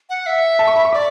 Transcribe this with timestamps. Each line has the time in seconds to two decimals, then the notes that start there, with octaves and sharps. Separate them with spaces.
0.10 F#5
0.26 E5
0.59 A5
0.67 C#6
0.76 B5
0.85 C#6
0.93 D5 D6